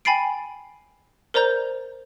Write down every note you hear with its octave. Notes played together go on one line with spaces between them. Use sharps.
G5 G#5 B5 A6 C7 D7
A#4 C5 D5 A#5 G6